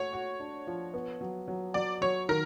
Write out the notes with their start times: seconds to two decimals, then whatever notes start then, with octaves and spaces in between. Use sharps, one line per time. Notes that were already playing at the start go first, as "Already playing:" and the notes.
Already playing: A3 F#4 C#5
0.13 F#4
0.40 D4
0.67 F3
0.94 B3
1.21 F#3
1.48 F#3
1.74 F#3 D5
2.01 F#3 C#5
2.29 D#3 A#4